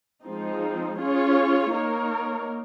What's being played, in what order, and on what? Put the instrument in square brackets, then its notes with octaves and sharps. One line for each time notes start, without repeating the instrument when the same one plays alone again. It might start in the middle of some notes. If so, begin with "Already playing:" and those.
[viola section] F3 G#3 C4 D#4
C#4 F4 G#4 C#5
A#3 D#4 A#4 C#5